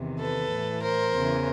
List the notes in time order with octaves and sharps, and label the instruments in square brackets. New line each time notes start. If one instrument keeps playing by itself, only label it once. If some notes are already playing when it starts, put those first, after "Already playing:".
Already playing: [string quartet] E2 C3 D#3
A4 B4
A2 E3
A#4 C5
E2 C#3 E3